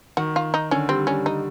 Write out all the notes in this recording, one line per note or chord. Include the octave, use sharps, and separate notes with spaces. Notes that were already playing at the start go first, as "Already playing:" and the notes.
D#3 F#4
F4
D#4
D3 C#4
G3 C4
G3 C#4
D#4